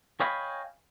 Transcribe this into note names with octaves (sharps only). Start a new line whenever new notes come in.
C#5 D#5 F5 G5 G#5 B5